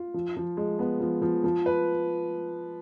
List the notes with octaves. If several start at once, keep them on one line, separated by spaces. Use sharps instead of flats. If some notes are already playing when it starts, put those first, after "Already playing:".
Already playing: F4
F3
F3
G#3
B3
F3
F3
F3
B4